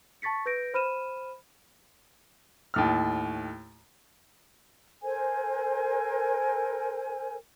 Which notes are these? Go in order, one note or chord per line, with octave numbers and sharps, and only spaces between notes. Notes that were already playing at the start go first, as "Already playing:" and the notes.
A5 C#6 A6 B6 C#7
B4 G6 A#6 D7
C5 B5 F6 D#7 E7
D#2 A2 F6
A4 A#4 C5 G#5